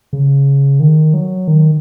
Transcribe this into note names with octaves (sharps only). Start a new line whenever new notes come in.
C#3
D#3
F#3
D#3